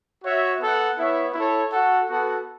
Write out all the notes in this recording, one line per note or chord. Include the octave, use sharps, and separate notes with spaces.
F#4 C#5 E5
B3 A4 F#5
B3 E4 C#5 E5
E4 A4 C#5
F#4 A4 F#5
B3 F#4 A4 F#5